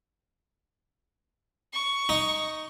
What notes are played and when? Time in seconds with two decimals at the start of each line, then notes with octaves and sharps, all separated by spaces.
1.74 C#6
2.09 D#4